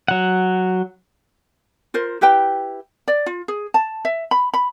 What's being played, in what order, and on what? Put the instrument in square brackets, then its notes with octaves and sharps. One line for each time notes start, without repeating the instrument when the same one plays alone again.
[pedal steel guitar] F#3 F#5
[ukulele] F4 A#4 C5
E4 G4 B4 G5
D5
F4
G#4
A5
E5
B5
B5